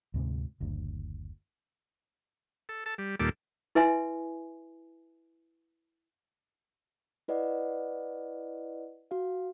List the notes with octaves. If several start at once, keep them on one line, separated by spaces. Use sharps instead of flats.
D2 G#2 C3 G#3
F#1 D2
A4
A4 A5
G3
D#2 A#2 G3 A4 D6
E4 B4 E5 G#5 C6
E4 B4 D5 D#5 F#5
F#4 F5